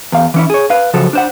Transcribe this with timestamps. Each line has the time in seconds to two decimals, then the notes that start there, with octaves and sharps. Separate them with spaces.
0.12 E2 F5
0.34 E3 C#4 E4
0.50 G#4 C#5
0.70 B4 F5
0.94 C#3 F3 F#3 A4
1.13 D4 C5 F#5